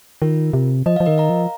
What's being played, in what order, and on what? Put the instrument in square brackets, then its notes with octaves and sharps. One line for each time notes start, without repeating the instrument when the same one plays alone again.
[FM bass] D#3 [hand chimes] F4 A#4
[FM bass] C3
[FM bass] F3 [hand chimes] D#5
[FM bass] F3 [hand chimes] F5
[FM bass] D#3 [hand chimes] A#4 D#5
[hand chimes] F5 A#5
[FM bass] F3